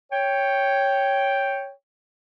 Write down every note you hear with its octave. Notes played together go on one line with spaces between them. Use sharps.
C#5 G5